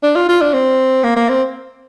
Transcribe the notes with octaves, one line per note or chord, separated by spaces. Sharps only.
D4
F4
F4
D4
C4
A#3
A#3
C4